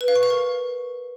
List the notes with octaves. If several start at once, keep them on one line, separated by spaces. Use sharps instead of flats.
B4
F5
C#6
F5
A#4